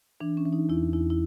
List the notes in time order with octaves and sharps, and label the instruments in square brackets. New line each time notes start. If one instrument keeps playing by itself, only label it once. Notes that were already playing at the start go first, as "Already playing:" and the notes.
[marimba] E3 D4
C#4
E3
D#4
E2 E4
E2 E4
E4